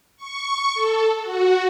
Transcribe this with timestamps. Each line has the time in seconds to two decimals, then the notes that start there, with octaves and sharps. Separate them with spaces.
0.17 C#6
0.74 A4
1.21 F#4